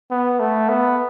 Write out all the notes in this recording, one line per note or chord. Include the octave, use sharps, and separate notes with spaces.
B3
A3
B3